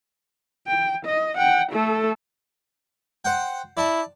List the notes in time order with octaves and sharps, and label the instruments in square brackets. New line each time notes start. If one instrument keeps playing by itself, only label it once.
[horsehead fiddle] G5
D#5
F#5 G5
A3 A4
[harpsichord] C5 F#5 G5
[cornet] E4 [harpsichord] D5 A5